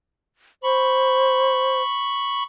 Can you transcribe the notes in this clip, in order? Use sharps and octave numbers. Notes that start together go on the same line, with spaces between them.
C5 B5 C#6